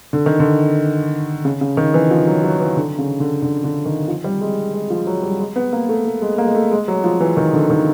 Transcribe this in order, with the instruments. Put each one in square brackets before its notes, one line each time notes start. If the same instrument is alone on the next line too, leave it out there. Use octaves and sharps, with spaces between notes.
[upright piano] D3
D#3
D3
C#3
C#3
D#3
E3
F3
F#3
F#3
E3
D3
C#3
D3
D3
D3
D#3
F3
G3
G#3
G#3
F3
F#3
G3
G#3
B3
A#3
A3
A3
G#3
A#3
G#3
A3
G#3
F#3
F3
E3
D#3
D3
D#3